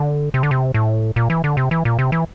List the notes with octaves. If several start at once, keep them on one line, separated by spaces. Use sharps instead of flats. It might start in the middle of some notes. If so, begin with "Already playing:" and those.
Already playing: D3
C3
D3
C3
A2
A#2
E3
D3
C3
E3
A#2
C3
E3